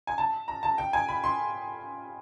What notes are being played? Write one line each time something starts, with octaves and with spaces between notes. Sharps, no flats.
G#5
A5
A#5
A5
G5
G#5
B5
C6